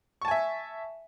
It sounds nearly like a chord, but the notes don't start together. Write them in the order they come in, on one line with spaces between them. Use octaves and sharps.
C#6 A5 G#5 E5